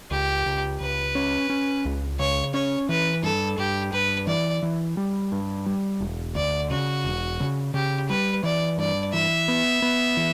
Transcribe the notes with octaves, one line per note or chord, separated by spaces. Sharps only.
C#2 G4
C#2
C#2 B4
C#4
C#4
C#2
C#3 C#5
C#4 C#5
E3 B4
G2 A4
G2 G4
G2 B4
E3 D5
E3
G3
G2
G3
E1
D2 D5
C#3 F#4
E1
C#3
C#3 G4
G3 B4
E3 D5
G2 D5
E3 E5
B3
B3
E3